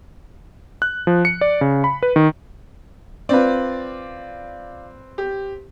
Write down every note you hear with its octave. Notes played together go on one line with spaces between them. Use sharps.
F#6
F3
C#7
D5
C#3
B5
B4
D#3
C4 F4 B4 D5
G4